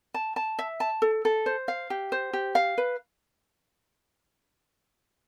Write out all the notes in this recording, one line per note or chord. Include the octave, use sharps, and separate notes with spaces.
A5
A5
E5
A5
A4
A4
C5
F5
G4
C5
G4
F5
B4